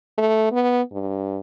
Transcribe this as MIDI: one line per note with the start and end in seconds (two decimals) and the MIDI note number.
0.18 0.52 57
0.52 0.82 59
0.93 1.39 43